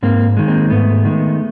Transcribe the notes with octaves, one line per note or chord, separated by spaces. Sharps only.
G#2 A#3 C4
D#3 G#3
A#3 C4
G#2 A3 B3
D#3 G#3